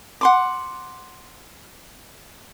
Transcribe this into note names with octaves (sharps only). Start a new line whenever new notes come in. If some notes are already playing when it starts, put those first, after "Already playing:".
F#5 C6 D6